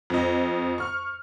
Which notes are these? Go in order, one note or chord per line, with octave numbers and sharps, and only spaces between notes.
F2 D#5
C#6 F6